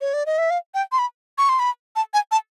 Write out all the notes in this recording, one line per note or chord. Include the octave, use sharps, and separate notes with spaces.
C#5
D5
D#5
E5
F5
G5
C6
B5
C#6
C6
B5
A5
G#5
A5